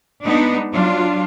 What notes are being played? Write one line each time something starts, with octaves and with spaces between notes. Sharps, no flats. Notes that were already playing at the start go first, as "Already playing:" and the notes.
G#3 B3 D4 D#4
F#3 D4 F4